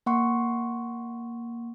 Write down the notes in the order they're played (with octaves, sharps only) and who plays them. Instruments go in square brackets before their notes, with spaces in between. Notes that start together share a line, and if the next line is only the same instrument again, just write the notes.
[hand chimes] A#3 F#5 C6 C#6